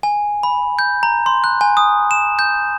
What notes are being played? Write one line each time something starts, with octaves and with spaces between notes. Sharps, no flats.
G#5
B5
G6
A#5
C6
F#6
G#5
D#6
E7
G6